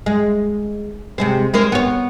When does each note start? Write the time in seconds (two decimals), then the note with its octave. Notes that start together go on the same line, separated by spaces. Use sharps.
0.06 G#3
1.18 C3 G#3 C4
1.54 G#3 A#3 C5
1.72 B3 C#5